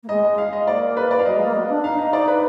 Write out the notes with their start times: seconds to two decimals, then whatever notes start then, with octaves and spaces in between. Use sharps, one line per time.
0.03 A#3
0.09 G#3 D#5
0.24 D#5
0.38 F5
0.53 D#5
0.67 A#3 D5
0.97 B4
1.11 D5
1.19 F5
1.26 F#3 D#5
1.36 G#3
1.45 A#3
1.55 B3
1.69 D4
1.84 D#4 F5
1.99 D#5
2.13 D5
2.28 B4